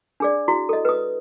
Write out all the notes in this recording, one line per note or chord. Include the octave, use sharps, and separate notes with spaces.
D4 G#4 D5
E4 F#4
A4 D#5
B4 D#6